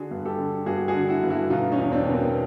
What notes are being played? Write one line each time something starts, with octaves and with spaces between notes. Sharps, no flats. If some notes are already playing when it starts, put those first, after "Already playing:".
Already playing: D3 F#4 G#4
G2
G4 A4
D3
G2 F#4 G#4
F#4 G#4
D3
E4 F#4
G2
E4 F#4
B2 D#4 F4
C#4 D#4
E2
C4 D4
B2
A#3 C4